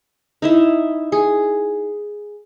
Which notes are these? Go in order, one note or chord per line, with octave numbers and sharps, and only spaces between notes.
D#4 E4 E5
G#4